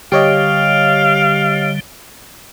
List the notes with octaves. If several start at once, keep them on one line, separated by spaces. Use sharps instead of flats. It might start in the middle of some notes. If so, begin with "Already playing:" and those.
D3 G3 G4 C#5 D#5 F5